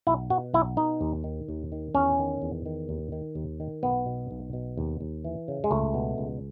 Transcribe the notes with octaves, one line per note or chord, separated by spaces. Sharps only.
B1 E4
B2 F#4
B1 E4
B2 D#4
D#2
D#3
D#2
D#3
E2 C#4
D#3
E2
D#3
D#2
D#3
D#2
D#3
B1 B3
B2
B1
B2
D#2
D#2
E3
C#3
G#3
C#2 A3
B2
C#2